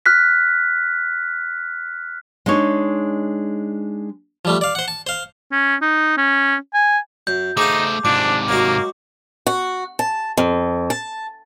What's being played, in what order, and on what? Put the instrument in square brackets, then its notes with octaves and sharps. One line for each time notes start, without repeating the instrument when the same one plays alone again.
[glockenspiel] F6 F#6 B6
[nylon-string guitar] G#3 D4 D#4 C#5
[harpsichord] F3 G3 A3
D5 F5
C5 F#5
A5
C5 F5
[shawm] C#4
D#4
C#4
G#5
[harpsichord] F#2 [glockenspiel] G6
[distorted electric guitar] A3 C5 [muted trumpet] D#4 [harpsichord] G#4 F5 [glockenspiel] D6
[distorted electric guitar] G#2 C3 [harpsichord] F3 [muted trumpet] D4 [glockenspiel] D6
[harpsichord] F#3 G#3 F#4 [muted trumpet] A#3
[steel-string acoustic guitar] F#4
A5
F2
A5